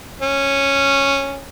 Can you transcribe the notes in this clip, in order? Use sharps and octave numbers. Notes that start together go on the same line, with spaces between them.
C#4